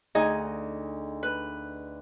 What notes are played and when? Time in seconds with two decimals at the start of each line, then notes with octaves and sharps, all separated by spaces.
0.15 D2 D#4 G#4 D#5
1.23 B4